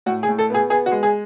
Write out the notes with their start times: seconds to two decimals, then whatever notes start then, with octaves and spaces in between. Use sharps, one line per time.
0.06 A2 F#4
0.23 G#4
0.29 A2
0.39 A4
0.50 B3 G#4
0.70 B3 G#4
0.86 F#4
0.92 G#3
1.03 G#4